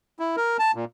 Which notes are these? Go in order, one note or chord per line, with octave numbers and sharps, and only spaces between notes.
E4
A#4
A5
A#2